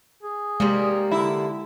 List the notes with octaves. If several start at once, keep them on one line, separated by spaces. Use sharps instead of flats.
G#4
C3 G3 G#3 A#3
D3 E4